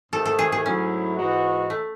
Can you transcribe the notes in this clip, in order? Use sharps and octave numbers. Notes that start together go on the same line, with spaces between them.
G#2 D#3 A3 A4
A4
G#4
G#4
G#2 F#3 A3 C#4 E4
G#2 E3 G#3 D#4 F#4
A3